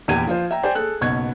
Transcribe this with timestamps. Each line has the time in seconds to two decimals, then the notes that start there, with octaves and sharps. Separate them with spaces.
0.08 A#1 E2 E4 G4 G#6 D#7
0.27 F3 F4 C5
0.51 E5 G5 A#5
0.63 G4 C5 D5 G5 G#5
0.75 G#4 A4 F#6
1.01 F#1 B1 B3 C#6 G#6